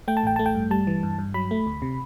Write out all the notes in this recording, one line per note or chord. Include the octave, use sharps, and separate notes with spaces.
A3 G5
A5
A1 G5
A3 A5
G5
G2
G3 A5
E3
G2
G2
F#3 B5
A3
D2
C3